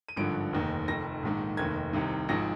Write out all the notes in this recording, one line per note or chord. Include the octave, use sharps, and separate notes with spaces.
D#7
G#1 G2 D3 F3 D7
F1 D#2 D#3
F1 F2 D#3 A#6
A#1 G#2 D#3
F1 D#2 D#3 G#6
C2 C3 D#3
G#1 G#2 F3 A#6